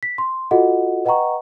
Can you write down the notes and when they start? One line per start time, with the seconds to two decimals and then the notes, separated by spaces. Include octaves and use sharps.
0.03 B6
0.18 C6
0.51 F4 F#4 A4 D#5 F#5
1.05 B4 D#5 F#5 G5 A#5 C#6